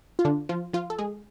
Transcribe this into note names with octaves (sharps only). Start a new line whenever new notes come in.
F4
D3 D4
F3 F4
F3 F4
A4
G#3 G#4